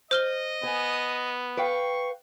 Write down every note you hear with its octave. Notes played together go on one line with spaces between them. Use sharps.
C5 D#5 F6 G7
B3 G#5
B4 F5 G5 C#6